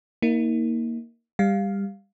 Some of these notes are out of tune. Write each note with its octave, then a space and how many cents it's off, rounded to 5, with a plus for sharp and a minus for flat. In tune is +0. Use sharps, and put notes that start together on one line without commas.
A#3 +0 D#4 +40
G3 +20 F5 +0